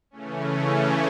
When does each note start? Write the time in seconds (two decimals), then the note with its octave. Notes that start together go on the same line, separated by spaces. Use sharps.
0.11 C#3 E3 A3 C#4